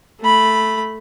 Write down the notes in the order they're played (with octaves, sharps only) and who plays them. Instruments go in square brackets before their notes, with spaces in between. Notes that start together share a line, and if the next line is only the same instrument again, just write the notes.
[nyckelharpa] A3 B5